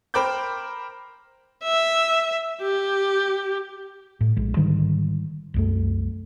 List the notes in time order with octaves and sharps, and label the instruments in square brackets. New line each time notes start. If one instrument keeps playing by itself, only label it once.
[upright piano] A#4 C5 G5 B5 D6 G6
[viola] E5
G4
[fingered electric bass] A2
A#1 G#3
G#2 D3 D#3 G3
C2 F#2 A3